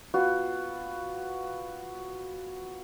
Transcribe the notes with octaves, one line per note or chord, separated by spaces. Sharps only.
B3 F4 F#4